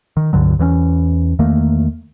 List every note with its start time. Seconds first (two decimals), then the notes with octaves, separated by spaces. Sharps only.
0.17 D#3
0.33 C#2 G2 D3 F#3
0.59 E2 E3 A#3 C#4
1.39 E2 D#3 A3 A#3